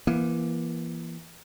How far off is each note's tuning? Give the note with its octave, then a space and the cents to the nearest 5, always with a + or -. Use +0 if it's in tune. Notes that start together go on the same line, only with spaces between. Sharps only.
E3 +25 A#3 +35